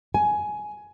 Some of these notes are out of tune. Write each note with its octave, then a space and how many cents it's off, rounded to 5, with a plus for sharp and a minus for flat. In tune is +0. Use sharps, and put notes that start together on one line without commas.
G#5 +15